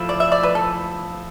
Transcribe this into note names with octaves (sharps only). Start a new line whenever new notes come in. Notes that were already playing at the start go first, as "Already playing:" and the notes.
Already playing: F3 A3 E4
D5
E5
D5
B4
A4